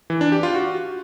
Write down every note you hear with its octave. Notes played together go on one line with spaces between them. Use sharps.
E3
D4
G4
F4
F#4